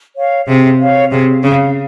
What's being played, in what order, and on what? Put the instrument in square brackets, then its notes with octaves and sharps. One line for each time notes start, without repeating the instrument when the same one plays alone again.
[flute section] C#5 F5
[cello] C3 [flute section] G#4
[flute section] C#5 F5
[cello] C3 [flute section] G#4
[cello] C#3 [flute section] C#5 F5